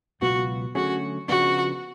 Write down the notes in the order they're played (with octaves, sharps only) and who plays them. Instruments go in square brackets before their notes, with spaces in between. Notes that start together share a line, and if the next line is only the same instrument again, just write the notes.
[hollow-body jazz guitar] C#2 B2 F#3 B3 F4 [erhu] F#4
[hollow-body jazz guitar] D3 F#3 A3 C#4 G#4 [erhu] F#4
[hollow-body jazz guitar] C#3 F3 B3 D4 [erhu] F#4